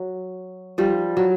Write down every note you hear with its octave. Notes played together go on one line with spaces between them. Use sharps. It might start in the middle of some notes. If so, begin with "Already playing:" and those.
Already playing: F#3
F3 G3
F#3